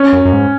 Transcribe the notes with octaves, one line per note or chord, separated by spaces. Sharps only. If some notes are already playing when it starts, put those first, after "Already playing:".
Already playing: C#4
F#2
F#2
G#2